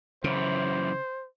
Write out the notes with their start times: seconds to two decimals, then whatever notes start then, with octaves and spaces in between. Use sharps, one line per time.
0.24 F#2 C#3 E3 C5